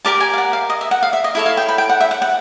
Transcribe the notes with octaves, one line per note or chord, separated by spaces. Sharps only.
G4 A#4 D5 A5
G#5
F5
F#5
F5
D#5
E5
F#5
F5
E5
D#5
E4 A4 C#5 E5
F5
G5
B5
G5
F#5
E5
F#5
F#5